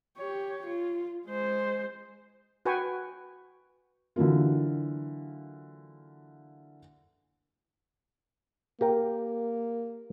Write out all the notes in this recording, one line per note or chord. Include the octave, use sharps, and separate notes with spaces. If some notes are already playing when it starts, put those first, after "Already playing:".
G4 C#5
F4
G#3 C5
F#4 B4 G5 G#5 C#6
D3 E3 F#3 A#3 F4
A#3 G4 A#4 G5